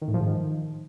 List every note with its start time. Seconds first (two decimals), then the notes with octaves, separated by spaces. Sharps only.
0.02 D#3
0.08 A2
0.14 F3
0.20 G#2
0.26 D#3